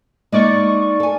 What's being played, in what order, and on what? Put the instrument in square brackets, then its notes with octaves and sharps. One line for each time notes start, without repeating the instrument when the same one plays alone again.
[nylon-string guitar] G#3 A#3 D#4 [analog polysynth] D5 C#6
[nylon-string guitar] A4 G#5